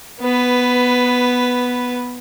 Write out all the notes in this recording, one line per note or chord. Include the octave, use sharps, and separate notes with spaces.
B3 B4